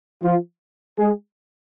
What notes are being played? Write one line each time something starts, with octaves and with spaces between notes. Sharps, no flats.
F3 F4
G#3 G#4